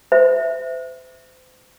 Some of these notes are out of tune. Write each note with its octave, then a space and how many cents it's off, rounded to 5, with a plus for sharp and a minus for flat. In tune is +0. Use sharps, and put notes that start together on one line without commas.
C5 -40 E5 +0